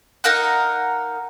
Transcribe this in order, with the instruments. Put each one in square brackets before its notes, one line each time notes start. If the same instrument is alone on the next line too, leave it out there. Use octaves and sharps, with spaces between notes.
[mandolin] D#4 A#4 F5 F#5